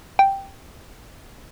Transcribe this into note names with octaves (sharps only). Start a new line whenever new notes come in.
G5